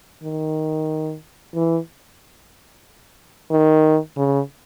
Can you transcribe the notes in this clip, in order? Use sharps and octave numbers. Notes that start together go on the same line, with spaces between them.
D#3
E3
D#3
C#3